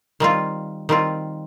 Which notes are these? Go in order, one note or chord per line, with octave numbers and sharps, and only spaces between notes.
D#3 G3 C4 F4
D#3 G3 C4 F4